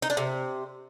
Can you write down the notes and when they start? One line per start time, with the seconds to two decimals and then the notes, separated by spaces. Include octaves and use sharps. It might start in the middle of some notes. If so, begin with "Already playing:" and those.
0.02 D#4
0.10 D4
0.17 C3